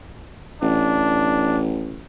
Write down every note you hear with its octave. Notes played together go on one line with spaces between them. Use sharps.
A1 D4